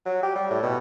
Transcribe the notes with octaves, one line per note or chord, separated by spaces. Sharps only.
F#3
G4
G3
A2
B2